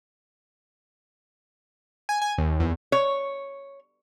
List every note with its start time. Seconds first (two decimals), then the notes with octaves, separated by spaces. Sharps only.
2.09 G#5
2.22 G#5
2.38 D#2
2.60 E2
2.92 C#5